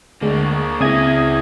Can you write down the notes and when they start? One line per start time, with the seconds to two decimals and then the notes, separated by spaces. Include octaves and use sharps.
0.22 D2 G#3 A#3 D4
0.80 C#2 C4 E4 G#4 E5 D#6 G#6 A#6